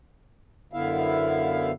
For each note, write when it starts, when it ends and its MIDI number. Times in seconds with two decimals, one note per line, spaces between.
0.73 1.72 42
0.73 1.72 50
0.73 1.72 59
0.73 1.72 64
0.73 1.72 76
0.73 1.72 77